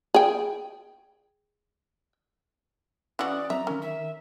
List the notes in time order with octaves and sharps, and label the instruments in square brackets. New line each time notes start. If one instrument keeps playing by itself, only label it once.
[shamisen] G#4 G5
[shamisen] E3 F#4 [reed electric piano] C#4 D#6 F#6 [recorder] D5
[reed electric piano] F#3 C4 C5 [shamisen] E5 [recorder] A#5
[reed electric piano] D#3 A#4 [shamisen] C#4
[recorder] E5